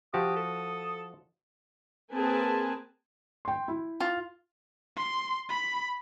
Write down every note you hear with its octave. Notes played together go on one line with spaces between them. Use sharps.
F3 F#4 G4 D#6
A4
A#3 C4 G#4 B4 G#5 A5
G5 C6
E4
F4
C6
B5